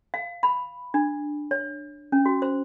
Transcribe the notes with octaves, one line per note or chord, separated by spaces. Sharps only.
F5
B5
D4
C#5
C#4
F#4
C5